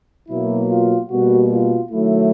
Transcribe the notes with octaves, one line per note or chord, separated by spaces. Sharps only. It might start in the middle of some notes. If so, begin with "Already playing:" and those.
B2 F#3 A#3 E4
F4
B2 G3 A#3 F#4
F4
D#3 F#3 A3 E4